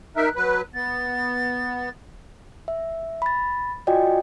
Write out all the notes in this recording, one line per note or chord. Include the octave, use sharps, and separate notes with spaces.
D#4 A#4 E5 F#6
F#3 B4
B3 A6
E5
B5 A6
F4 F#4 D5 D#5 G5 G#5